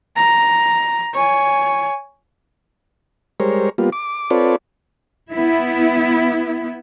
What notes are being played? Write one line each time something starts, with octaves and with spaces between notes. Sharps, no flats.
A#5
C#5 G#5
G3 G#3 A#4 C5 C#5
G3 A#3 B3 F4
D6
C4 F4 A4 B4 C#5 D5
B3 E4